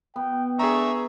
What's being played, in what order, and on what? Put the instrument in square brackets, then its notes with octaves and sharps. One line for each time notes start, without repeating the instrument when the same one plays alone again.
[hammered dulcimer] B3 [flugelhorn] G5
[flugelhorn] D4 [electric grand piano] G#4 A#5 [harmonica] E5 C#6